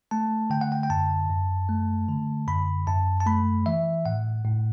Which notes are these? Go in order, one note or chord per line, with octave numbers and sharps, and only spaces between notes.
A3 A5
D3 G5
F#5
G5
G5
F#2 A5
F#2
A3
D3
F#2 B5
F#2 A5
A5
A3 B5
E3 E5
A2 F#5
A2